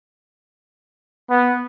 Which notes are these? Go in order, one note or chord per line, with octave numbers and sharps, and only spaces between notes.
B3